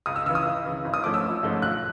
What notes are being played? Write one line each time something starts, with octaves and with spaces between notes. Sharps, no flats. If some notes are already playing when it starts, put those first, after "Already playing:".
C#2 D#6
E6
C#3 E3 E6
D#6
C#2
C#3 E3
G#1
D#6
G#2 F3 A3 C#4 D6
E6
G#1
G#2 F3 A3 C#4
B1 F#6